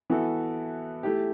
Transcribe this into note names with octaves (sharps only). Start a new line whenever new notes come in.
E3 B3 F#4 A4
A3 E4 G4